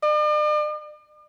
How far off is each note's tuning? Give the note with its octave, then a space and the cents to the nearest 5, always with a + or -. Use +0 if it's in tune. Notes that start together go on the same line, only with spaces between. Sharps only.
D5 +45